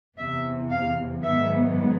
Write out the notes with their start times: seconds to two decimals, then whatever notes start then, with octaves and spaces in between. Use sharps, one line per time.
0.18 E2 C3 E3 E5
0.70 F5
1.23 G#2 D#3 F#3 B3 E5